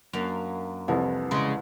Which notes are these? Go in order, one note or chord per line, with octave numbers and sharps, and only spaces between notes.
F#2 A#3 D4 F5
C2 F2 E3
C#3 G#3